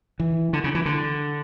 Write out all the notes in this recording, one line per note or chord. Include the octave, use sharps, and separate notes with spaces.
E3
D3
C#3
E3
D3